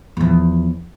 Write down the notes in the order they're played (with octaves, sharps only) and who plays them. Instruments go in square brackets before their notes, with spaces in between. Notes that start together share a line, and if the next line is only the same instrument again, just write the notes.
[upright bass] E2 F3